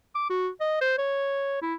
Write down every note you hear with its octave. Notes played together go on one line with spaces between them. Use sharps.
D6
F#4
D#5
C5
C#5
E4